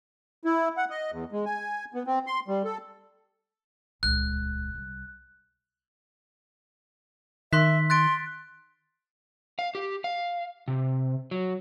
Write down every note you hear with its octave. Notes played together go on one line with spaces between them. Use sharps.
E4
F#5
D#5
E2
G#3
G#5
B3
C4
C6
G3
A4
D#1 C#2 F#6
C2
D#3 E5 C6 F#6 B6
C6 F#6 A6 D7
F5
G4
F5
C3
F#3